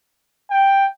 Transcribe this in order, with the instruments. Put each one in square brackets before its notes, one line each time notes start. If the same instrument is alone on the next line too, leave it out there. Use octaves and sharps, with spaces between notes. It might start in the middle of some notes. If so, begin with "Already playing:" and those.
[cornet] G5